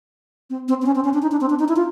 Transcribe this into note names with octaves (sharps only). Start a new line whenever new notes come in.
C4
C4
C4
C#4
C4
C#4
D4
D#4
D4
C4
D4
D#4
E4
F4